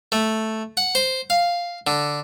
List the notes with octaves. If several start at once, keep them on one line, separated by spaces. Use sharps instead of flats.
A3
F#5
C5
F5
D3